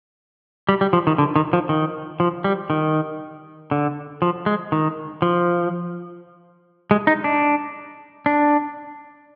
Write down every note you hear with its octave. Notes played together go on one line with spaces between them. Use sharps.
G3
G3
F3
D#3
D3
D#3
F3
D#3
F3
G3
D#3
D3
F3
G#3
D#3
F3
G#3
D#4
D4
D4